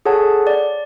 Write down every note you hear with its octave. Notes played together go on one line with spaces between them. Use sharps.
G#4 A4 C#5 F#5 A5
D5